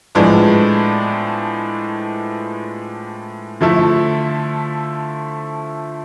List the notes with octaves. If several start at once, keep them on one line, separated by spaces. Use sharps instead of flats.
A2 F3 G#3 B3 D4
D3 F3 A3 E4 A4